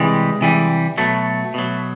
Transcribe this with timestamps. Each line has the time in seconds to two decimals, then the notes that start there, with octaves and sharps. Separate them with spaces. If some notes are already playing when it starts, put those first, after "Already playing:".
Already playing: C3 E3 G3 G#3
0.41 C3 E3 G3
0.97 B2 F#3 A3
1.54 B2 F#3